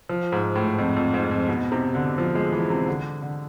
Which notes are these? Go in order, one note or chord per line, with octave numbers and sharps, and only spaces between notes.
F3
G#2
A2
F2
F2
G#2
F2
B2
C3
D3
F3
G#3
E3
C3
D3
D3